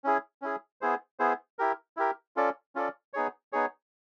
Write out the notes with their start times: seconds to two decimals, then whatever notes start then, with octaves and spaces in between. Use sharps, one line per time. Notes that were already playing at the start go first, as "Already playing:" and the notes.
0.04 C#4 E4 G#4
0.42 C#4 E4 G#4
0.81 B3 E4 G#4 C5
1.19 B3 E4 G#4 C5
1.59 E4 G4 A#4
1.97 E4 G4 A#4
2.36 C#4 F4 A4 D5
2.75 C#4 F4 A4 D5
3.13 B3 D#4 G#4 C#5
3.52 B3 D#4 G#4 C#5